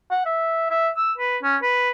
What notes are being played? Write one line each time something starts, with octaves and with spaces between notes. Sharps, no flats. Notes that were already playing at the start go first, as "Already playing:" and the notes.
F#5
E5
E5
E6
B4
C#4
B4